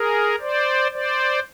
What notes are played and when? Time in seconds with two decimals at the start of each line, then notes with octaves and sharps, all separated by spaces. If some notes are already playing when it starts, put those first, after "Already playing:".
Already playing: G#4 A#4
0.40 C5 D5
0.92 C5 D5